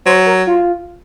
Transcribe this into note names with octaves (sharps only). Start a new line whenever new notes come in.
F#3 C5
A#4
F4